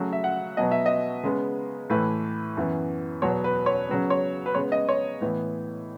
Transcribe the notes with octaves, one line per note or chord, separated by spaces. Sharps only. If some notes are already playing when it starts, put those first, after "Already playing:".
Already playing: C#3 F#3 A3
E5
F#5
B2 F#3 B3 D#5
E5
D#5
C#3 G#3 B3
A2 E3 A3 B4
F#2 E3 B3
E2 B2 F#3 B3 C#5
B4
C#5
C#3 F#3 B3
C#5
B4
C#3 G#3 B3 C#5
D#5
C#5
A2 E3 B3